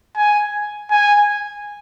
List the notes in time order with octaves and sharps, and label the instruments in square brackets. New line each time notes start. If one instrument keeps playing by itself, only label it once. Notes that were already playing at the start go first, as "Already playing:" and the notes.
[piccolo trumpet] G#5
G#5